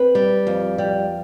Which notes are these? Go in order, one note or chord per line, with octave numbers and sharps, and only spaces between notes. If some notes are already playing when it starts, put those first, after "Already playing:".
Already playing: C4 B4
G3
F2
G3